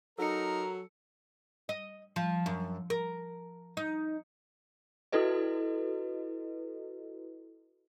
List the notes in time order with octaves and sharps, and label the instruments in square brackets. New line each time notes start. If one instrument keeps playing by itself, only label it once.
[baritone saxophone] F#3 [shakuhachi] D#4 [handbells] A4 C#7 [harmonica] A#4
[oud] D#5
F3
F#2
A#4
D#4
[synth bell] E4 F#4 A4 B4 D#5